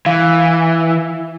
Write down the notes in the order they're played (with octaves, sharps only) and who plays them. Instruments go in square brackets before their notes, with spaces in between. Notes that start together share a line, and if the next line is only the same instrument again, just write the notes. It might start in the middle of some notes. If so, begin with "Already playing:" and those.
[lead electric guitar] E3 [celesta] F5